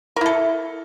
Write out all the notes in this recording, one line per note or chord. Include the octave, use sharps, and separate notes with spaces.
E4 A4 A#4